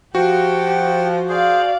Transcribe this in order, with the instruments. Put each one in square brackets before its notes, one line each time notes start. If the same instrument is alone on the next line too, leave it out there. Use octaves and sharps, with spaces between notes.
[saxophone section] F3 [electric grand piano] F#4 [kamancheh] G4 [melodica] F#5 G5
[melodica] G#4 C5 [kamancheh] D5 F5